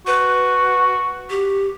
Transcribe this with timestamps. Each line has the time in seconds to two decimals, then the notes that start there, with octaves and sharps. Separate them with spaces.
0.07 F#4 B4
1.30 G4